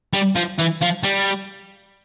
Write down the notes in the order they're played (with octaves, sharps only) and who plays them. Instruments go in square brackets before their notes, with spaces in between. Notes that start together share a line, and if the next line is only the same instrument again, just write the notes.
[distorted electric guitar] G3
F3
E3
F3
G3